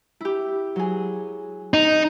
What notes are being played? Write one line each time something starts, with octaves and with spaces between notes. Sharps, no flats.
E4 G4
F#3 G#4
D#4